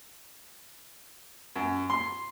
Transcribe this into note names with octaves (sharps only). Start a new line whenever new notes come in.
F#2
C6